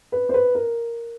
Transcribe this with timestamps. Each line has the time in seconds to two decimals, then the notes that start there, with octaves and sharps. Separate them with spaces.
0.12 B4
0.29 C5
0.34 B4
0.55 A#4